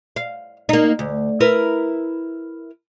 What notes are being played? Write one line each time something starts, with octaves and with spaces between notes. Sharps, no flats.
F5
A#3 D#4
D2
E4 A#4 B4